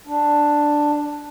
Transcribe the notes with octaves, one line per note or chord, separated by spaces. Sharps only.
D4